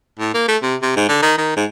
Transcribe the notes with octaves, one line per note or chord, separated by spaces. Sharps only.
A2
A#3
A3
C3
C3
G#2
D3
D#3
D#3
G#2